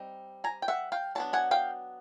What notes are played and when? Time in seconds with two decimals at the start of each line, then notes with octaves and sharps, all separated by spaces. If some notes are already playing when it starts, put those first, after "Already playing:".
Already playing: G3 C4 D#4
0.44 G#5 A#5
0.62 G5
0.68 E5 F#5
0.92 F5 G5
1.15 F#3 B3 D4 A5
1.33 F#5 G#5
1.51 F5 G5